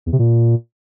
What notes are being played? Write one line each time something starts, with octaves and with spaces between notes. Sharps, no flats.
E2
C3
A#2